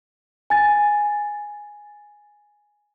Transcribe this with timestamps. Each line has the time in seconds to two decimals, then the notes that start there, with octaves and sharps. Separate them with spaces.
0.50 G#5 A6